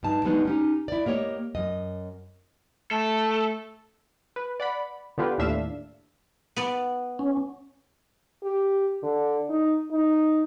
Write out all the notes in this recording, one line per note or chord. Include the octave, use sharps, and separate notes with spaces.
G2 D#4 A5
G3 G#3 B3 D4 D#4
C#4 D#4 G4
E4 D5
A#3 G4 C#5 D#5
F#2 D#5
A3 A4
B4
D5 F#5 B5
D3 B3 F4 G4 B4
D#2 A2 D4 E5 F5 E7
B3 D5
C#4
G4
D3
D#4
D#4